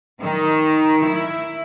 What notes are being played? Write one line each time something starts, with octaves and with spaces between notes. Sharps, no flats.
D#3
E4